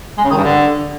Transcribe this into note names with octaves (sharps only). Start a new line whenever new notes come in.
G#3
C#3
D#3
G2
D3